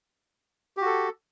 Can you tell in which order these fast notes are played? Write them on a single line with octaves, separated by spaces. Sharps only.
G4 F#4 A4